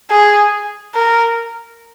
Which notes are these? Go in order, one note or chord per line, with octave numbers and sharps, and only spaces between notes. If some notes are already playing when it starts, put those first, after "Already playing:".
G#4
A#4